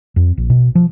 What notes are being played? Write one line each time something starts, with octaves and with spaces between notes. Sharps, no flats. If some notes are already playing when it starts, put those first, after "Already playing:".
F2
A#1
B2
F3